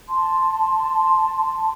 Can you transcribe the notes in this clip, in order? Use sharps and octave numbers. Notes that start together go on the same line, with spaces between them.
A5 C6